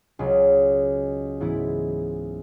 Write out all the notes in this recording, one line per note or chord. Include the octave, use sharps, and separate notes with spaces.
C#2 C#3 F#3
G#2 E3 B3 E4